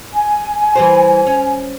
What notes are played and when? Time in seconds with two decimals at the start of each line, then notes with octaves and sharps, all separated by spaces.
0.13 G#5
0.76 E3 G3 C5
1.27 C#4